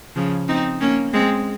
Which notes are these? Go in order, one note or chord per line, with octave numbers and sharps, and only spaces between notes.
C#3 F3
C4 D#4
A#3 C#4
G#3 C4